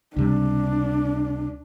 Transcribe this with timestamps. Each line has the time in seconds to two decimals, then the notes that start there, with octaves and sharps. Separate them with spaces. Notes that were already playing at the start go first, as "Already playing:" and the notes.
0.16 C#2 C3 G3 D4